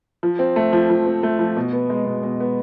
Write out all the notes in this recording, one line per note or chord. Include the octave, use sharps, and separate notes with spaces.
F3
C4
A3
F3
F3
C4
A3
F3
B2
B3
G#3
B2
B2
B3